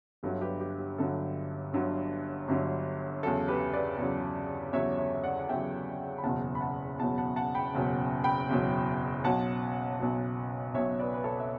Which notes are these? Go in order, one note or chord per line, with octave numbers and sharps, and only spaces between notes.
G1 G2 D3 F#3 A4
G4 B4
G4
G4
G1 G2 D3 F#3 A4
G1 G2 D3 F#3
G1 G2 D3 F#3
E2 C#3 F#3 A4
G4 B4
B4 D5
E2 C#3 F#3
E2 C#3 F#3 C#5 E5
C#5 E5
E5
D5 F#5
F#5
E2 C#3 F#3 E5 G5
B5
F#1 E2 B2 F#3 F#5 A5
B5
F#5 A5
F#1 E2 B2 F#3 F#5 A5
F#5 A5
F#5 A5
G5 B5
F#1 E2 B2 F#3
G5 B5
F#1 E2 B2 F#3
B1 B2 F#3 F#5 A5
B1 B2 F#3
B1 B2 F#3 C#5 E5
B4 D5
B4
A4 C#5
E5